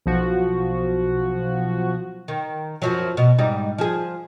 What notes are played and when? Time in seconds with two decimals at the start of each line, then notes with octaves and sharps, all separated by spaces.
0.06 B1 F3 F#4
2.28 D#3
2.82 F#2 F3 F#3
3.17 B2
3.38 G#2 G3 D#4
3.78 F3 G#4